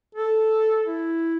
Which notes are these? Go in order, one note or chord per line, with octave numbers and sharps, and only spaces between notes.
A4
E4